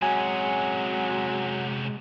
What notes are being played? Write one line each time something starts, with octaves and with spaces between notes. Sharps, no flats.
C3 F#3 G#3 C#4 G#5